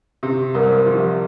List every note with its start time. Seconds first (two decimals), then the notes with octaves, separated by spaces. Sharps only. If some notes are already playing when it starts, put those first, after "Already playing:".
0.23 C3 G4
0.55 C2 A#4
0.63 C5
0.72 A#4
0.86 F3 G4